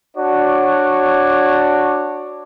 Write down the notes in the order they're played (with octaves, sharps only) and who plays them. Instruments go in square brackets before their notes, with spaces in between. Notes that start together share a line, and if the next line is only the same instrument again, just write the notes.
[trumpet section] D4 F#4 C#5 D5